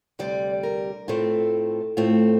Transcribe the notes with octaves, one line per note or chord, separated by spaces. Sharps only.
D2 C3 G3 D5
A#4
A2 A3 C4 F4
A2 A3 C4 F4